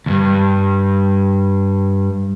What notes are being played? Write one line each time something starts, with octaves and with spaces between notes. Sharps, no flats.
D2 G2